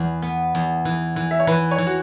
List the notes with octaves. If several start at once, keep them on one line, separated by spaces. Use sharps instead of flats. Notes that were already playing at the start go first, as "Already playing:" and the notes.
Already playing: E2 E3
B3
E2
E3
E3
E5
C#5
E3 B4
C#5
E3
F#4